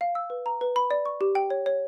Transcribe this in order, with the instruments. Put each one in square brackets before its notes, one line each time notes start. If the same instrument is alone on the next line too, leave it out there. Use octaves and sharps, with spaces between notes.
[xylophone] F5
E6
B4
A#5
B4
B5
D5
C#6
G4
G5
C#5
C#5